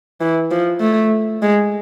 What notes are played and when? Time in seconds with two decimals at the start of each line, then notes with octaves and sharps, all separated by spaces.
0.21 E3
0.51 F3
0.80 A3
1.42 G#3